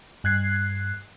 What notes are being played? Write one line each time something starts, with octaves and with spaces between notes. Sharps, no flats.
G2 F#6 G#6 C7